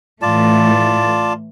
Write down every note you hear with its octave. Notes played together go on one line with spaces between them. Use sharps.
A2 E3 A3 F4 D5 A5